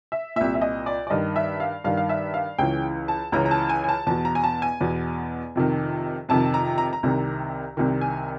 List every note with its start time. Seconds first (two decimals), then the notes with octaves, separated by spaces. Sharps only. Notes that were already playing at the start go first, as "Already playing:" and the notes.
0.12 E5
0.36 C2 A#2 E5
0.54 E5
0.61 D#5
0.86 D5
1.07 D5
1.10 G2 D#3 D#5
1.36 E5
1.60 F5
1.84 G2 D#3 F5
1.97 F5
2.09 E5
2.34 F5
2.58 C#2 C#3 E3 G5
3.08 A5
3.32 C#2 C#3 E3 A#5
3.46 A#5
3.51 A5
3.69 G#5
3.84 G#5
3.89 A5
4.07 E2 B2 A5
4.25 A#5
4.35 G#5
4.44 A5
4.62 G#5
4.81 E2 B2
5.55 F2 C3 D#3
6.29 F2 C3 D#3 A5
6.54 A#5
6.78 A#5
6.93 A#5
7.03 C2 C3 D#3
7.77 C2 C3 D#3
8.01 G#5